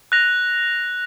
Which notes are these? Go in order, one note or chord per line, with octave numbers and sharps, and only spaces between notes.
F#6 A#6 F7